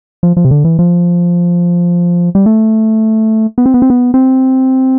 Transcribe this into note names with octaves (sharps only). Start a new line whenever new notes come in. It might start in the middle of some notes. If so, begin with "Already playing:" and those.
F3
F3
C3
D3
E3
F3
G3
A3
B3
C4
B3
C4
B3
C4